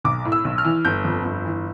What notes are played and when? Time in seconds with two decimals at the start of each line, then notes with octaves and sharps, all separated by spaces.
0.04 B1 D6
0.25 A2
0.32 E6
0.45 B1
0.58 F6
0.64 E3
0.85 G1 G6
1.05 F2
1.25 G1
1.45 E3